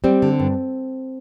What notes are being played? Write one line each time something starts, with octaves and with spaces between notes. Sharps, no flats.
G3 C4
D3
G2